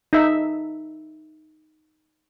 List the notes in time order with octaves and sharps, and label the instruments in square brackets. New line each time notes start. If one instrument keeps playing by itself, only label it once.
[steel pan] D#4 E5